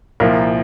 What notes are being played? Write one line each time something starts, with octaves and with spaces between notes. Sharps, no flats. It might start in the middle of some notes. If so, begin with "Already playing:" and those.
C2 A#2 F3 A#4